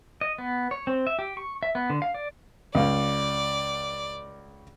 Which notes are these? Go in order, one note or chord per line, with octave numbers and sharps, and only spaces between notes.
D#5
B3
C#5
C4
E5
G4
C#6
E5
B3
D3
F5
D5
C#2 D5 F5